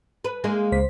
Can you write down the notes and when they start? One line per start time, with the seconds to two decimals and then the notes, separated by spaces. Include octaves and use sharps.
0.24 B4
0.44 G#3 A#3 D#4
0.72 C#2 C5 B6